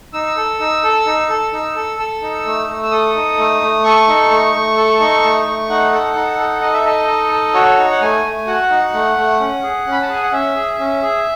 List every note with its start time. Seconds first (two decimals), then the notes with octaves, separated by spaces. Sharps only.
0.13 D#4 E6
0.37 A4
0.60 D#4
0.83 A4
1.06 D#4
1.29 A4
1.53 D#4
1.76 A4
1.98 A4 E6
2.22 D#4
2.45 A3
2.68 A3
2.83 E6
2.91 A4 D#6
3.15 D#4
3.38 A3
3.61 A3
3.84 A4 C#6
4.07 D#4
4.30 A3
4.54 A3
4.76 A4
5.00 D#4
5.23 A3
5.46 A3
5.70 D#4 F#5
5.92 A4
6.15 D#4
6.39 A4
6.62 D#4 D#5
6.73 E5
6.85 A4 D#5
7.08 D#4
7.31 A4
7.54 F#4 C#5
7.78 D#4
7.90 F#5
8.01 A3 G#5
8.24 A3
8.47 F#4 F#5
8.70 D#4
8.93 A3
9.17 A3
9.40 C#4
9.63 G#4
9.86 C#4
9.92 B5
10.02 A5
10.09 G#4 G#5
10.23 F#5
10.32 C#4 E5
10.55 G#4
10.79 C#4
11.02 G#4